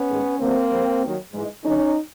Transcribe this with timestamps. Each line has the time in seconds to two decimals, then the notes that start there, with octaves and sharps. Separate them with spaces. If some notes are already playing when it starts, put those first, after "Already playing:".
Already playing: B3 C#4
0.09 G#2 D#3 G#3
0.39 D#2 D3 F#3 A3 A#3 C4
0.71 F2 D3 G3
1.02 D#2 D#3 F#3
1.33 G#2 E3 G#3
1.64 F#2 D3 F#3 A3 C#4 D#4